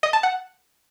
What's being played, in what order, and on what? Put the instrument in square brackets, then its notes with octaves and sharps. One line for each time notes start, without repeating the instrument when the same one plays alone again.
[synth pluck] D#5
A5
F#5